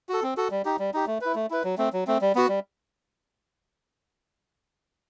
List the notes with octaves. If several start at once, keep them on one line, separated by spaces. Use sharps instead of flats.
F#4 A4
C4
F#4 A4
G3
D#4 G4
G3
D#4 G4
A3
E4 B4
A3
E4 B4
F#3
A3 C4
F#3
A3 C4
G3
B3 F#4
G3